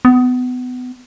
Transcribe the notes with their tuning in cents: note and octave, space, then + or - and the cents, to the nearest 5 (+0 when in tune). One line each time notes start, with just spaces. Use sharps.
B3 +25